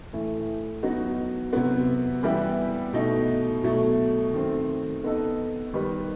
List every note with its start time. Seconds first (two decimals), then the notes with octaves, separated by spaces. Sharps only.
0.12 A2 E3 A3
0.83 F#3 B3 D#4 F#4
1.53 C3 F#3 B3
2.23 E3 G3 B3 E4 G4
2.93 B2 A3 D#4
3.63 B2 F#3 A3
4.33 D#3 A3 C4
5.04 B3 D#4 A4 D#5
5.73 D#3 G3 D#4 G4 B4